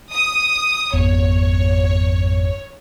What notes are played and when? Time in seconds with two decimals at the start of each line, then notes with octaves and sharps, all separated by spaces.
0.11 D#6
0.93 G#1 F2 B3 C#5